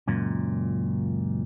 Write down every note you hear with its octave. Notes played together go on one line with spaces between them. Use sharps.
C#2 F#2 A#2